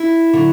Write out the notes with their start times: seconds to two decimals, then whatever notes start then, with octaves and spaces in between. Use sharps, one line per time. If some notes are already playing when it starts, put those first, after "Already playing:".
Already playing: E4
0.33 D3 F#3